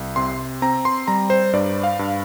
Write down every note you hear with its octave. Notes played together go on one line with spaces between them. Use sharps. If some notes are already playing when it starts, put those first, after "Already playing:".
Already playing: C2
C3 C6
C4 A#5
C6
G3 A#5
C5
G2 D5
F5
G2